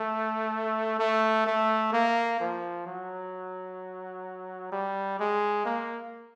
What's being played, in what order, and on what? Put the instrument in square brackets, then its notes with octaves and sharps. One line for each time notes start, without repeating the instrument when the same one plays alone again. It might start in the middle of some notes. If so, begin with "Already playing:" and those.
Already playing: [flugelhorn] A3
A3
A3
A#3
F3
F#3
G3
G#3
A#3